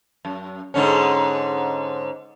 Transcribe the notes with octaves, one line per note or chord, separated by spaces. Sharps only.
F#2
G#2 D3 C#4